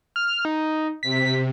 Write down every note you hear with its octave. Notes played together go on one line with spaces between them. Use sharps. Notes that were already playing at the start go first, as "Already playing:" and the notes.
F6
D#4
C3 B6